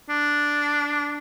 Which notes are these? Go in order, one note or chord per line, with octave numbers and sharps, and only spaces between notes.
D4